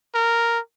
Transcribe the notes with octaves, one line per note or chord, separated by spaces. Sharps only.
A#4